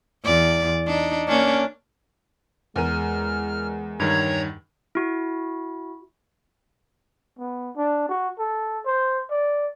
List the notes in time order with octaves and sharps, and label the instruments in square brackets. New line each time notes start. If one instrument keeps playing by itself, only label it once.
[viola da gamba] E2 D5
D4 D#4
A#3 C#4 D4
[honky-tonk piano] E2 A#4 D#7 [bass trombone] G#3 [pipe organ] F6
[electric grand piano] G2 D#3 [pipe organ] C#5 A#5 G#6
[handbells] E4 F#4
[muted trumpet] B3
D4
F#4
A4
C5
D5